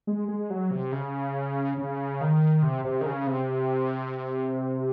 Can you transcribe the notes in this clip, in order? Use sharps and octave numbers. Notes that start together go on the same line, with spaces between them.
G#3
G#3
F#3
C3
C#3
C#3
D#3
C3
C3
D#3
C#3
C3